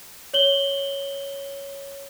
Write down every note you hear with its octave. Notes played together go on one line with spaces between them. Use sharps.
C#5 F#7 G7